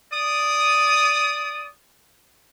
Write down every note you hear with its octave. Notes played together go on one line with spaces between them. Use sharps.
D5 D#6